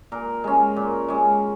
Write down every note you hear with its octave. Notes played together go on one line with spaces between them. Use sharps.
A#2 A#4
G#3 C#4
A#2
G#3 C#4